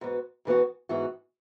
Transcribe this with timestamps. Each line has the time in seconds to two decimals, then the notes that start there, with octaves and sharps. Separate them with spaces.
0.01 G#2 E3 B3 F#4
0.45 G#2 E3 B3 F#4
0.89 G#2 E3 B3 F#4